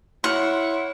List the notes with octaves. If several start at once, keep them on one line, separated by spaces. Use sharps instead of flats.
E4 C#5 F#5 C6 F6